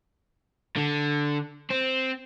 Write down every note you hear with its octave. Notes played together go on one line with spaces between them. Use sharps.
D3
C4